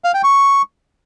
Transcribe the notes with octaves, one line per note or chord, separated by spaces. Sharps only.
F5
G5
C#6